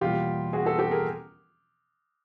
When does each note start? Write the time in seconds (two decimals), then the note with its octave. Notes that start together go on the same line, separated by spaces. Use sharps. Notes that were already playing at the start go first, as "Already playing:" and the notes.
0.01 E2 B2 G3 A#3 F4 G4
0.53 F#4 G#4
0.65 G4 A4
0.79 G4 A4
0.91 G#4 A#4